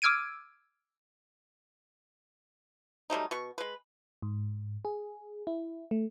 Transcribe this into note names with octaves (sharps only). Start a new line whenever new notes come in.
D6 E6 F6 G#6 D7 D#7
F#3 G3 A3 D#4
B2 C#6
G#3 B4
G#2
G#4
E4
A3